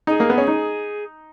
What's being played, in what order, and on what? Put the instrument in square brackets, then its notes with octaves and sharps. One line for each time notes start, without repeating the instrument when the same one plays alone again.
[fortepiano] D#4 [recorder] G#4
[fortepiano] A#3
B3
C#4
D#4